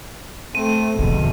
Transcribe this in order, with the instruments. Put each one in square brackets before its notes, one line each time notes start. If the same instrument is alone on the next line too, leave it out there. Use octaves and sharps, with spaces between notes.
[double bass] A3 C4 [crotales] D#7
[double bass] E2 B2 [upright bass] D3 F3